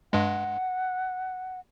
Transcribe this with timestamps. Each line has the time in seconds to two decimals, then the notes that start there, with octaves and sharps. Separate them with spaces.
0.13 G2 G#3 F#5